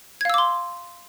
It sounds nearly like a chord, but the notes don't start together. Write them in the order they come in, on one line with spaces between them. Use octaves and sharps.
G#6 F5 E6 D6 C6